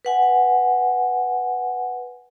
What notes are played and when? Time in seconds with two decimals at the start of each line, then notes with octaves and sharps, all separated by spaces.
0.05 B4 F#5 G#5